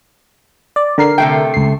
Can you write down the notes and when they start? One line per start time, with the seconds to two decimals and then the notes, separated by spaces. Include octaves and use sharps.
0.76 D5
0.98 D3 A#4 C7
1.18 C3 A3 G5
1.54 C#2 C7